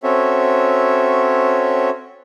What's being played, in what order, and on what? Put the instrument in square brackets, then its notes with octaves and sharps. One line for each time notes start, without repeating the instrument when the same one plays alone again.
[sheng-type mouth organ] C4 C#4 F#4 A4 C#5 E5